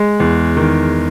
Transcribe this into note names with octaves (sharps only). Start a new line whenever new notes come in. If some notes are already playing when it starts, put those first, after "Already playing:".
Already playing: G#3
E2
D#3